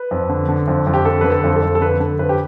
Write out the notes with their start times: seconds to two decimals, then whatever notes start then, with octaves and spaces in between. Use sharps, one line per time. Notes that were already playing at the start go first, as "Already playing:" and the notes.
Already playing: B4
0.11 F2
0.29 D3
0.49 D3
0.68 F2
0.87 F2
0.94 G4
1.05 D3 A4
1.21 D3 B4
1.30 A4
1.44 F2
1.56 A4
1.62 F2
1.75 A4
1.81 D3 B4
2.00 D3 A4
2.19 F2 B4
2.29 G4